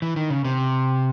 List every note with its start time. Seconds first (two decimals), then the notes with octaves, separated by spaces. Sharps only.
0.02 E3
0.16 D#3
0.30 C#3
0.45 C3